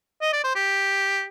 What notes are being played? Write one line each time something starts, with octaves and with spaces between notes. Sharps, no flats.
D#5
D5
C5
G4